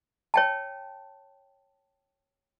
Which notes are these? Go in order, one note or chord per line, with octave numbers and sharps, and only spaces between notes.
C#5 G5 A5